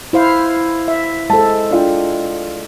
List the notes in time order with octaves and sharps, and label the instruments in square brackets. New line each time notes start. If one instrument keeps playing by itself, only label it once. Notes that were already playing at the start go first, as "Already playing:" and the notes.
[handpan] E4 C5 F5
E5
[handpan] G#3 A4 [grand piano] C5 A5
[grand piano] D4 F4 G5